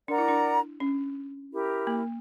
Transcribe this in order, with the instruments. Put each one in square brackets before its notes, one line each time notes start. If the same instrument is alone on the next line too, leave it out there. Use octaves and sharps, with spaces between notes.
[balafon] D4 [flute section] A#4 D5 F#5 A#5
[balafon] E4
D4
C#4
[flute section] E4 G4 A#4
[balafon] A#3